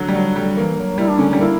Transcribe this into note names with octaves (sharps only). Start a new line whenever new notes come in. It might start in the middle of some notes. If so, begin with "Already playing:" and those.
Already playing: D3 F#3
G3
F#3
G3
E3 A#3
F#3
G3 E4
D4
D3 C#4
G3 C#4
A#3 E4